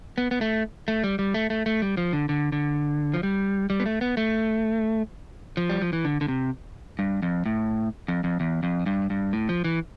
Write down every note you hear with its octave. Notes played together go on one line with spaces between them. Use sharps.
B3
B3
A3
A3
G3
G3
A3
A3
A3
G3
F3
D3
D3
D3
F3
G3
G3
B3
A3
B3
A3
F3
G3
F3
E3
D3
D3
C3
G2
F2
A2
F2
F2
E2
F2
G2
G2
A2
F3
E3